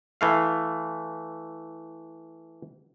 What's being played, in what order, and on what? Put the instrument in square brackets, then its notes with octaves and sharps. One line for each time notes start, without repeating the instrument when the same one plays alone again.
[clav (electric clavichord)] E3 A3 F5